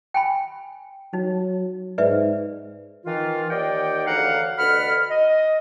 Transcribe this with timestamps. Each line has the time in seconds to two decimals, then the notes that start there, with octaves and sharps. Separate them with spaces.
0.14 G5 G#5 B5
1.13 F#3 D#4
1.98 G#2 B4 D5 E5
3.05 D#3 E3 F4
3.50 D#2 D5 D#5 F#5 G5
4.06 D2 C#3 E3 F5 F#5 A#5
4.58 D2 B2 A4 F#5 B5 F6
5.09 D#5